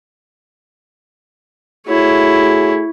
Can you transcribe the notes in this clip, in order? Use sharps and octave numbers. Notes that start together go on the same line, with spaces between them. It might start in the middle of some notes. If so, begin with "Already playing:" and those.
A3 E4 F#4 G#4 C#5